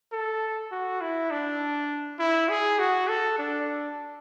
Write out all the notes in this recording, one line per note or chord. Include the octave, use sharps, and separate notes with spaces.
A4
F#4
E4
D4
E4
G#4
F#4
A4
D4